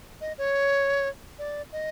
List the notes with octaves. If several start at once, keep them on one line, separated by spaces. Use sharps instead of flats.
D#5
C#5
D5
D#5